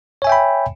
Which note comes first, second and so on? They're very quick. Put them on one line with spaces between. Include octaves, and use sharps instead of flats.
C#5 G#5 E5 G5 B5